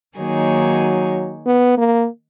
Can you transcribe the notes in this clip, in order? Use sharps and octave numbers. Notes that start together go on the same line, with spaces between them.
D#3 F#3 A#3 D#4 G#4 C#5
B3
A#3